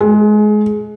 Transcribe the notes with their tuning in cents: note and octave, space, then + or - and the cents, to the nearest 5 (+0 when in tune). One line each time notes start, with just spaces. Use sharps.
G#3 +25